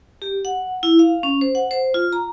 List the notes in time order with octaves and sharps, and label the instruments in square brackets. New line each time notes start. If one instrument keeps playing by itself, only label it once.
[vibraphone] G4
F#5
E4
F5
C#4
C5
F#5
C5
F4
A#5